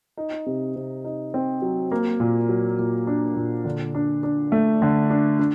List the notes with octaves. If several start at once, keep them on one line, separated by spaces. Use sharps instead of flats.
D#4
C3
C3
D#4
C4
F#3
A#3
A#2
F#3
A#2
D4
A#2
D3
D4
D4
A3
D3
D4
D4